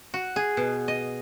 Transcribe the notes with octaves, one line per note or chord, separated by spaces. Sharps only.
F#4
G#4
B2
D#5